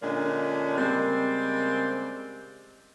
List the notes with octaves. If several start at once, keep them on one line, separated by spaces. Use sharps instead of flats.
A#2 D3 G#3 A#3 C#4 D4
C#3 G3 G#3 A#3 C4